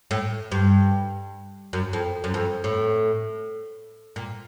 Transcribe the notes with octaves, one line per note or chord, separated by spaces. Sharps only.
A2
G2
F#2
F2
F#2
F2
A2
A#2